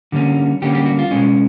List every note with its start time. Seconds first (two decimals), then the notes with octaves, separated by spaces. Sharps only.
0.12 D3 G3 A#3 C#4
0.62 D3 G3 A#3 C#4 G4
0.75 G4
0.86 F#4
0.99 F4
1.11 B2 G#3 C#4